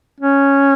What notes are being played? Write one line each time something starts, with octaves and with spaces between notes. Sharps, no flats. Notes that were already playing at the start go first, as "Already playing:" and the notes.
C#4